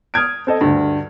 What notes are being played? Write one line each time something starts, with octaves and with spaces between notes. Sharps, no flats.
D#6 F6 G#6 D7
C4 A4 D#5
D2 G2